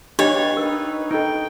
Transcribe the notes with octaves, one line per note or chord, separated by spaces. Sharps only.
D4 G4 B4 C#5 D#5 F5 G5
D#4 A#4 B4
D#4 A4 G5